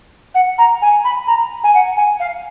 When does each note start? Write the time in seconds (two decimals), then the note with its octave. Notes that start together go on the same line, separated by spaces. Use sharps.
0.35 F#5
0.58 A#5
0.82 G#5
1.04 B5
1.27 A#5
1.64 G#5
1.74 F#5
1.97 G#5
2.20 F5